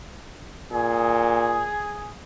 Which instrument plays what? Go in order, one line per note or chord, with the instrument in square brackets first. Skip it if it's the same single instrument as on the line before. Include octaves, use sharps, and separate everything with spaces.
[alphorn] A#2 [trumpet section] G#4